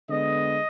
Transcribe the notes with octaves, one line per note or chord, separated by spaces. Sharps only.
D3 G#3 B3 D#5